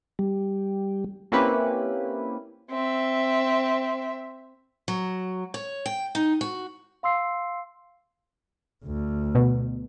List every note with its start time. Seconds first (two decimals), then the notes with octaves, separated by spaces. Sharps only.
0.19 G3
1.32 A#3 C4 C#4 E4 G4 B4
2.71 C4 E5
4.88 F#3
5.54 C#5
5.86 G5
6.15 D#4
6.41 F#4
7.03 F5 C6 E6 C7
8.85 D2
9.35 B2